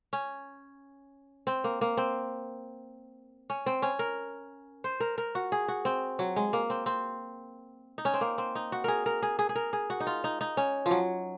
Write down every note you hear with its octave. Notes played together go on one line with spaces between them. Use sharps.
C#4
C4
A#3
A#3
C4
C#4
C4
C#4
A#4
C5
A#4
A#4
F#4
G#4
F#4
C4
F#3
G#3
A#3
C4
C4
D#4
C#4
C4
A#3
C4
D#4
F#4
G#4 A#4
A#4
G#4
G#4
G#4
A#4
G#4
F#4
D#4
F4
D#4
D#4
C#4
F3
F#3